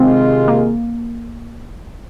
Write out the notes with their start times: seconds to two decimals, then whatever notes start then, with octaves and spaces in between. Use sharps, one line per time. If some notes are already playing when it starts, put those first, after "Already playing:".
Already playing: C3 D#3 G#3 C4 F4
0.48 A#3